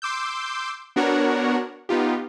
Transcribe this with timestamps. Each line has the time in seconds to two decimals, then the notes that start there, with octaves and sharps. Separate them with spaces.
0.02 C6 D6 E6 G6
0.96 B3 D4 F#4 A#4 C#5 F#5
1.89 B3 D#4 F4 G4